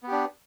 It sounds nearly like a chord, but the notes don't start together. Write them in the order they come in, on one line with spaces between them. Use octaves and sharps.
B3 G4 D4